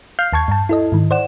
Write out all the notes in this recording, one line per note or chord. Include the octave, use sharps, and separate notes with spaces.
F5 F6 G6 C7
D#2 A5 C#6 G#6
G2 A5
E4 A4 D#5
G#2 D#3
C5 D5 F#5 E7